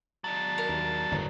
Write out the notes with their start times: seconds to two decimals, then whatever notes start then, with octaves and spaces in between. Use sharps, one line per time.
0.24 F#3 D4 A5
0.58 A#4
0.69 D#2
1.12 G1 E2 A2